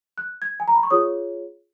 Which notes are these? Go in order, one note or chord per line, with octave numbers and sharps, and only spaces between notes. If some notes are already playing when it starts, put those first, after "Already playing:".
F#6
G#6
G#5
A#5
B5
C#6
F4 G#4 C#5 D#6